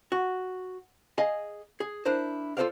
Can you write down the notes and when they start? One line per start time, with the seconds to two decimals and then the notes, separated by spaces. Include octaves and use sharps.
0.12 F#4
1.18 G#4 D#5 F5 G#5
1.80 G#4
2.05 D4 E4 A#4 C5
2.57 F4 A4 A#4 C5 D5 F5